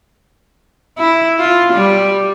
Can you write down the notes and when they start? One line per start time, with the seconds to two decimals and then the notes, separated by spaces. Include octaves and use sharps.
0.98 E4
1.39 F4
1.74 G3